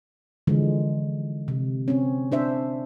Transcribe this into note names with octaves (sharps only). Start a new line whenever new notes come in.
D3 E3 F3 G#3
C3
C4 C#4
D4 C5 E5